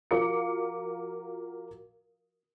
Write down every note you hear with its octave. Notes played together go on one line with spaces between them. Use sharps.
F3 F#4 A#4 F5 D6 C#7